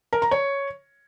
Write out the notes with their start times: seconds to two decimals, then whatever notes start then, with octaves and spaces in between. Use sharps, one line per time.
0.13 A#4
0.22 A#5
0.31 C#5